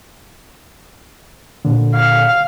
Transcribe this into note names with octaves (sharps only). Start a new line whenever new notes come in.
A#2 D3
F5